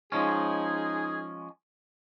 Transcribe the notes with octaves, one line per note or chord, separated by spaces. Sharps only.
F3 G#3 C#4 D#4 G#4